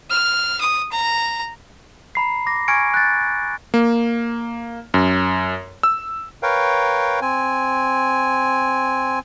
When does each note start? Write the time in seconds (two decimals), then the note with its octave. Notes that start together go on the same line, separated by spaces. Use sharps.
0.11 F6
0.61 D#6
0.92 A#5
2.15 A#5 B5 C7
2.46 D6 A#6
2.68 G#5 C#6 F6 G#6 C#7 D7
2.94 F#6 A6
3.74 A#3
4.94 F#2
5.83 E6
6.43 A#4 B4 C#5 F5 G5
7.22 C4 G#5